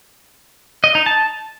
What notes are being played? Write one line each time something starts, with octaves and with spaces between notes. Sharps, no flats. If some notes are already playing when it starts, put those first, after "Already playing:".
D#5
D#4
A5